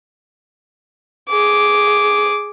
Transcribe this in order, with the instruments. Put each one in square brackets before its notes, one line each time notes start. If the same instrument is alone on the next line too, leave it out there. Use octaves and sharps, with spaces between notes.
[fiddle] G#4 D6